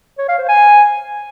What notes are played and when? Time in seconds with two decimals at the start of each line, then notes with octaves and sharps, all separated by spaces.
0.18 C#5
0.28 F5
0.39 C5
0.49 G#5